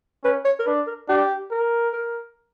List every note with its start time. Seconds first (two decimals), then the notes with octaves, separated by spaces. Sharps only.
0.24 C#4 B4
0.45 C#5
0.59 A#4
0.66 D4 B4
0.87 A#4
1.08 D4 G4
1.51 A#4
1.93 A#4